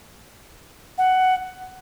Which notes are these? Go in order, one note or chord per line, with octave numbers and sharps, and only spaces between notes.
F#5